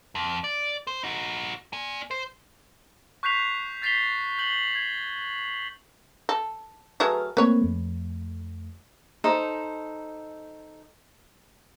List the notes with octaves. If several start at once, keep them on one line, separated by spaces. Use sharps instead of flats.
F2
D5
C5
D#4 F#4
D5 G#5
C5
C#6 F#6 G6 B6 C7 F7
G6 A6 B6 C7 F7 G7
G6 A6 F#7 G7
G#6
A4
F#3 A3 G#4 B4 F6
A3 A#3 C4 B4 C#5
F2 A3
D#4 A4 C5